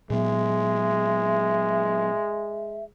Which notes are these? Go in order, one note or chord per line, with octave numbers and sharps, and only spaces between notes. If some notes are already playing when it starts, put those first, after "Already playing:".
A#2 F#3 G#3 B3 E5